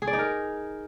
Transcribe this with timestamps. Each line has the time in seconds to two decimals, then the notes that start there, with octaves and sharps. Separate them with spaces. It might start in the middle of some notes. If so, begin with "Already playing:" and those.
0.02 G#4
0.07 D5
0.13 D#4
0.19 A#4